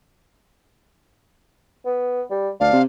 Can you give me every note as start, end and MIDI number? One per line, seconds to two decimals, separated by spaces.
1.86 2.23 59
2.31 2.51 55
2.60 2.73 38
2.60 2.78 62
2.60 2.82 77
2.73 2.84 48